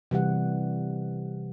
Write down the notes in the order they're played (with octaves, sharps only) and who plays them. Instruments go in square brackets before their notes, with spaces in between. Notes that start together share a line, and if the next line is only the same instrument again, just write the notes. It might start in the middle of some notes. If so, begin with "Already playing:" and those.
[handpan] C3 E3 G3 F#5